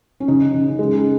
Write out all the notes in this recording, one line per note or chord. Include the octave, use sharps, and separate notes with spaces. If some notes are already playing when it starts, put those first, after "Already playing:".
C#4
C#3 D#4
C#3
G#3